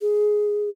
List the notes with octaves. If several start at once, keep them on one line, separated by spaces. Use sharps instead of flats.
G#4